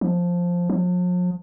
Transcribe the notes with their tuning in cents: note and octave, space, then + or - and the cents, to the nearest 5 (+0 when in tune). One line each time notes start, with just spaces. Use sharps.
F3 +5
F3 +45